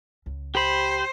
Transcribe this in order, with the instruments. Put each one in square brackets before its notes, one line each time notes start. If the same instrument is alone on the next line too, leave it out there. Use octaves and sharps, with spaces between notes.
[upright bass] C#2
[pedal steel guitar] G4 B5 [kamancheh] C5